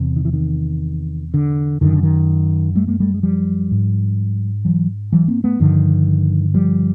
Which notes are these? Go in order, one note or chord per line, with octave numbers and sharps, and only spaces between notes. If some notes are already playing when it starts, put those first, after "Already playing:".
Already playing: E2 C3
D#3
E3
D#3
D3
F#2 D3 D#3
D3
D#3
G3 A3
G#3 A#3
G3 A3
G#3
F3 G3
G#2
E3 F#3
E3 F#3
A#3 C4
A3 B3
G2 D3 D#3 F3
F3 G3